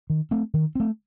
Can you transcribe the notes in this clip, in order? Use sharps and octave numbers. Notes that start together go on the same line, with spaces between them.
D#3
A3 C4
D#3
A3 C4